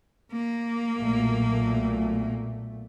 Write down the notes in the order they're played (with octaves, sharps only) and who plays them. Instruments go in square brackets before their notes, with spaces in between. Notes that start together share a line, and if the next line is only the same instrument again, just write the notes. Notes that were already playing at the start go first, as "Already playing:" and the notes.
[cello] A#3
[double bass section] B1 A#2 A3